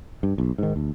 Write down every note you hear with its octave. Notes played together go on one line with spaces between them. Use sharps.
G2
B1
G#2 D#3
D2